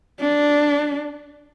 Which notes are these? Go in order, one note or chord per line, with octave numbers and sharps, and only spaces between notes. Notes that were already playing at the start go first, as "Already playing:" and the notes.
D4